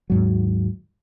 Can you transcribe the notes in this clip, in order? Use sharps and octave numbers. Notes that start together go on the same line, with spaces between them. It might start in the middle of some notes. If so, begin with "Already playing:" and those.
D#2 G#2 F#3